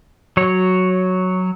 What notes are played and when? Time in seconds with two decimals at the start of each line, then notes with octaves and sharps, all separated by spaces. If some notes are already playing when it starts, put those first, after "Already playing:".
0.37 F#3 C#5